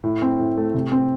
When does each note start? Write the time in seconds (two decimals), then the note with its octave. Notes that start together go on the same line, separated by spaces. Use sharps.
0.04 A2
0.22 C4
0.39 A2
0.57 A3
0.74 C3
0.92 C4